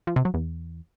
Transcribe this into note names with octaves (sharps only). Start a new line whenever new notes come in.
F3
C3
F#3
E2